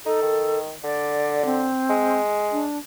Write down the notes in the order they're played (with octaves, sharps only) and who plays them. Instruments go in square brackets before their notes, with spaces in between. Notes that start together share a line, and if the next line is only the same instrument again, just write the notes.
[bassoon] D#4 [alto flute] A4
[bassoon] D#3
[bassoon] D3 [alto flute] D5
[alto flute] C4
[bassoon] G#3
[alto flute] D4